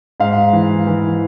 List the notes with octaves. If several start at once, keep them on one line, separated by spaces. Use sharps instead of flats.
G#2 F5
E3
E3